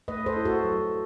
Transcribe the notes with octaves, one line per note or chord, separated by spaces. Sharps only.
A3 B4 D#5
A4 C5
E4
F#4 A4
F#3